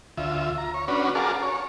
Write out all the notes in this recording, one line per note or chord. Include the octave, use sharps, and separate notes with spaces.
D2 F4 E5
A#5
C#5
C#4 D4 F#4 B4
F#4 G#4 A#4 F5 A5 D6
C#5